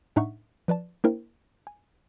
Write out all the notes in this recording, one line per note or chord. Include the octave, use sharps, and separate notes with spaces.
A2 D4 D#4 E5 F#5 C#6
F3 B4 D5 A5
A#3 D4 E4 A#4 C5 G5
G#5